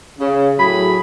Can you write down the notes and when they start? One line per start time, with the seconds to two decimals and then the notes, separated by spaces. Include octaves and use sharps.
0.19 C#3
0.58 A2 F#3 G#4 B5